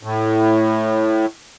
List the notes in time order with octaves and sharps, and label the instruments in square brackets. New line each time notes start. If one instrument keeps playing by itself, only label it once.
[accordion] A2